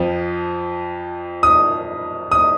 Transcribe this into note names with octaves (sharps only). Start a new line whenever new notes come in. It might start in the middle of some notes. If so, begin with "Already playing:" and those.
Already playing: F2 F3
D#6
D#6